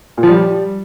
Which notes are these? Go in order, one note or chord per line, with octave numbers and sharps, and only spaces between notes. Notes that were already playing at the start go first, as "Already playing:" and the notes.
A#2
F3
G3